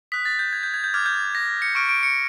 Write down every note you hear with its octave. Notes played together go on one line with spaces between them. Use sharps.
D#6 F#6 B6
A6
G6
G#6
G6
G#6
G6
D6 F6 G#6
G6
G#6
A#6
C#7
C#6 F6 D7
D7
C#7